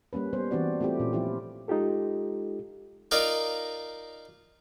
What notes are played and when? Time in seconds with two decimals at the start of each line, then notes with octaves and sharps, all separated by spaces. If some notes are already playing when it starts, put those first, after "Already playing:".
0.13 G3 A#3 C#4 B4
0.33 G3 B3 C5
0.51 E3 C4 D4 F#4 D5
0.80 A3 C4 E4 F4 G4
1.00 A#2 C#4
1.13 F3 E4 F4 G4
1.68 G#3 D#4 F4 G4 A4
3.11 D#4 F4 A#4 D5